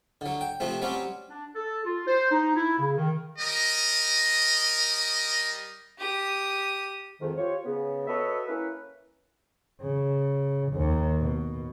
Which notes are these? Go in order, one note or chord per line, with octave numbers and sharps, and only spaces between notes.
D3 F#3
G5
C3 F3 A3 C4
F#3 G3 C4 C#4
D4
A4
F4
C5
D#4
E4
C#3
D#3
G3 A#4 D#5
G4 D#6
F2 G#2 D#3
F4 G4 C5 C#5
C#3 B3
F#4 A4 B4 C#5 D#5 E5
A#3 C#4 E4 A#4 B4
C#3
D#2
B2